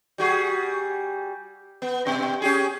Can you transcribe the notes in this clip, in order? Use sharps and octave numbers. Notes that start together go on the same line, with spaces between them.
G3 F#4 G#4
B3
G2 B2
C#4 G4 G#4